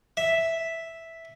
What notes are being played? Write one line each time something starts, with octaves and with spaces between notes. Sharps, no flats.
E5